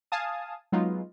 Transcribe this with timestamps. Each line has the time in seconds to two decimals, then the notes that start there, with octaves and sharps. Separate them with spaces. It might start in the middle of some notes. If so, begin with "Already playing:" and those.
0.12 F5 G#5 A5 D#6
0.72 F#3 G#3 B3 D#4 F4